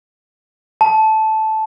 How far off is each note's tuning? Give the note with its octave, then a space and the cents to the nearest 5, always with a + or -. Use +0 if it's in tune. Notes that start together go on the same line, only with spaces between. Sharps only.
A5 -10